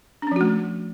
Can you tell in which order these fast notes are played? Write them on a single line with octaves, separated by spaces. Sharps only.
D4 C#4 F3 F#4 A3